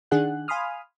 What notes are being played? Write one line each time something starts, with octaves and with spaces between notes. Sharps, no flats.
D#3 D4 G#4 F#5 F#6
F5 G#5 B5 C6 D#6 F6